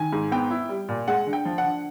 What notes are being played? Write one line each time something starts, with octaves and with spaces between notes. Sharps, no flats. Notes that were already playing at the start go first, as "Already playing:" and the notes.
Already playing: D#3 G#5
G#2
B3 G5
E4
G3
A#2
G#3 F#5
D3
G5
F3
F#5
D3